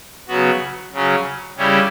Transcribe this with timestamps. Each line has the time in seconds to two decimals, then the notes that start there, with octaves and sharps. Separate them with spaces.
0.28 C#3 F#3 B3 F#4
0.93 C#3 F#3 C#4
1.56 C#3 G3 C#4 E4 G4